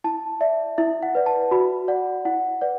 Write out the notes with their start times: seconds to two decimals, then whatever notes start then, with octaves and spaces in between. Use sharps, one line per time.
0.04 E4 A5
0.41 D5 E5
0.78 E4 E5
1.03 F#5
1.15 B4 D5
1.26 A5
1.51 F#4 B5
1.88 D5 F#5
2.25 E4 F#5
2.61 B4 D5 F#5